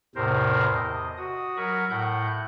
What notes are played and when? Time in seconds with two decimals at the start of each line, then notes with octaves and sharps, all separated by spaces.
0.16 E2 A2 C3 A#4 C5
0.75 D#5
1.17 F#4 D#6
1.57 F#3 A#4 B5 C#6
1.90 A2 F#5 G6